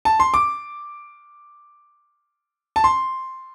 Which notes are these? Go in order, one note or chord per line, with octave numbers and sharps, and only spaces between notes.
A5
C6
D6
A5
C6